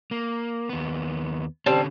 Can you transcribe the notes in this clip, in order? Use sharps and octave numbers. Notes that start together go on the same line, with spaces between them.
A#3
D#2 B3
D3 G3 C4 C#4 A5